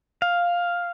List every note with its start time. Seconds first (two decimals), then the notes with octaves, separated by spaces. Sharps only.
0.22 F5